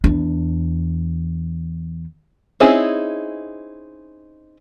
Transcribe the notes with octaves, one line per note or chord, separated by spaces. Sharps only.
E2 D4
C4 C#4 D#4 E4 G#4